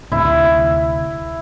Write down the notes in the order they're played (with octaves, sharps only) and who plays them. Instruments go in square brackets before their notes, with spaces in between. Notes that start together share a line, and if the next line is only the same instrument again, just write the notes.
[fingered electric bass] D2 C3 [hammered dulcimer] E4